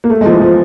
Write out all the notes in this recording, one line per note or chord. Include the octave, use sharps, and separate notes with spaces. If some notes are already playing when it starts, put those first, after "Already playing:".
A#3
A3
G#3
F3
E3
F3